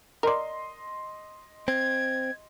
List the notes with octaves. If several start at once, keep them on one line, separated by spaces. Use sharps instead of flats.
A#4 D5 D#5 C6
C4 G#6